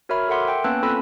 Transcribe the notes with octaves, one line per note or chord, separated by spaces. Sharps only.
F#4 A#4 C#5 E5 B5 F6
A4 A#4 E5 F#5 C6 D6
G5
A#3 B3 C#4 B4 A5 F#6
C4 F4 A4 B5 E6